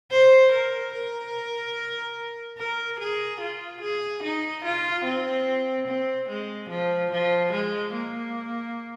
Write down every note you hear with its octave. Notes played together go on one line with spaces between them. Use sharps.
C5
A#4
A#4
A#4
G#4
F4
G#4
D#4
F4
C4
C4
G#3
F3
F3
G#3
A#3